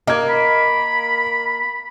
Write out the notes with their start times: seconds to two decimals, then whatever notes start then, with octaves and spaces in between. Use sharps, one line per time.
0.07 A#3 D#5 G#6
0.30 B5